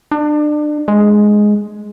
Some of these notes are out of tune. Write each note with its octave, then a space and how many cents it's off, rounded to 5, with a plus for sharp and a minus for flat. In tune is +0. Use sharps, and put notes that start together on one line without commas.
D4 +30
G#3 +5